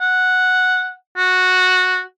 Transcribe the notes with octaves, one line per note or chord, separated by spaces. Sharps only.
F#5
F#4